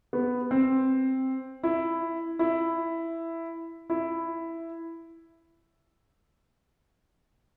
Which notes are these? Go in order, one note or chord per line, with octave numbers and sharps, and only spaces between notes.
B3
C4
E4
E4
E4